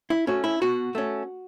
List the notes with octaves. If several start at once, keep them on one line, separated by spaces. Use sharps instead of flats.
E4
A3 C#4 F#4
E4
B2 F#4
A3 C#4